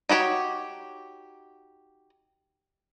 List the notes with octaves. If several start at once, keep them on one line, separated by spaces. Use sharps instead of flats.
D#4 F#4 G4 C#5